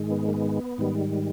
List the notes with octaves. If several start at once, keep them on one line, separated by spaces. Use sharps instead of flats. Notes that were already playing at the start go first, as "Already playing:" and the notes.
Already playing: G#2 D#3 G#3
B3
A#3
B3
G#2 D#3 G3